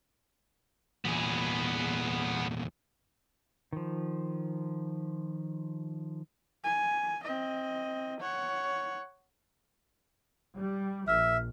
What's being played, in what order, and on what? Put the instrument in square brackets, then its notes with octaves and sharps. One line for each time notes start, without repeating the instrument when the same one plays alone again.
[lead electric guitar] E2 A#2 [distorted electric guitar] B3 G#4
[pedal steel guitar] D#3 F3
[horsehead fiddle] G#5
C4 D#5
C#5 F#5
[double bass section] G3
[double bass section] A#1 [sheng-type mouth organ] E5 [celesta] F6